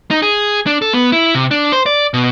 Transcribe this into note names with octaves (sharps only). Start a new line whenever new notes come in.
D#4
G#4
D4
A4
B3
E4
C3
D4
C5
D5
B2